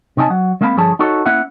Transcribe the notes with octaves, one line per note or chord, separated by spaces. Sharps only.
C3 C#4 D#4 G#5 A5
F#3 F#5
G#3 A#3 C4 F5 G#5 B5
G2 D3 F3 G#4 C#5 A5
D#4 F#4 A4 C#5
A#3 C#4 E4 E5 F#5